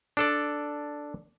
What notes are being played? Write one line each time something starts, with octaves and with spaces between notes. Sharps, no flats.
D4 A4 D5